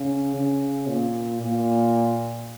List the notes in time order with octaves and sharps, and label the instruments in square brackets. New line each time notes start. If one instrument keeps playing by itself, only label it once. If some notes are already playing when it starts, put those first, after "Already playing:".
Already playing: [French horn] C#3
C#3
A#2
A#2